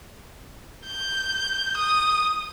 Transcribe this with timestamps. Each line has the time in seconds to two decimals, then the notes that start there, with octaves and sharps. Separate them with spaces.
0.87 G6
1.77 D#6